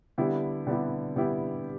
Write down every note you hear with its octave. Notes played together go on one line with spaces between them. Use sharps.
D3 G3 B3 E4 G4
D3 G3 B3 E4 G4
D3 G3 B3 E4 G4